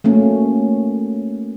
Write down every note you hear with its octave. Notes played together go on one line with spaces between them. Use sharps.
A3 A#3 C#4 F#4